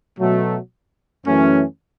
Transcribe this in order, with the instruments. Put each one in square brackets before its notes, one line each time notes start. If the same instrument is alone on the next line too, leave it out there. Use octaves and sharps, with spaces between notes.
[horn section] B2 F#3 A3
F#2 E3 A3 C#4